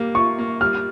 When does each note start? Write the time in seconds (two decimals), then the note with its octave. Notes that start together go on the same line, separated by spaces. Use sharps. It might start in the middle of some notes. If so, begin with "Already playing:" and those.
Already playing: G3 A#3
0.15 F4 C#6
0.39 A#3
0.61 G3 F6